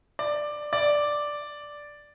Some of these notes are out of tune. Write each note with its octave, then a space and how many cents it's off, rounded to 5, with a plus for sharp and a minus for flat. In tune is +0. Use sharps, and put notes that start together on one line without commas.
D5 +10
D5 +0